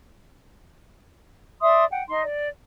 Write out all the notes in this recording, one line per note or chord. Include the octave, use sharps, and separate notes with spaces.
D5 E5 C6 D#6
F#5 G5
D#4 C6
D5